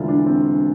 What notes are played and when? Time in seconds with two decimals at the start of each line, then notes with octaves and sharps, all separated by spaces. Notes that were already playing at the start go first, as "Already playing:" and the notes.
Already playing: E1 D2 D3 E4 F4
0.08 D4
0.26 C4